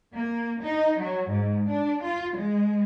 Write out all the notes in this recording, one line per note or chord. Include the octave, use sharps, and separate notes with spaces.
A#3
D#4
F#3
G#2
D4
F4
G#3